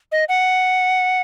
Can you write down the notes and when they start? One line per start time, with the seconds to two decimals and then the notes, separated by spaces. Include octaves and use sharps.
0.12 D#5
0.29 F#5